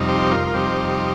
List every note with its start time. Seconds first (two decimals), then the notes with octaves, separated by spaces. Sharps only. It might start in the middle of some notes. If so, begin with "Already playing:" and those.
Already playing: F2 C3 G3 D#4
0.08 G4 C5
0.31 F4 A#4
0.47 A#4
0.54 F2 C3 G3 D#4 G4 C5